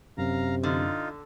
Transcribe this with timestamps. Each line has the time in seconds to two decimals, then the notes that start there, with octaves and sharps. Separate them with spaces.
0.18 F#2 C3 F5 A#5
0.63 D3 D#4 F4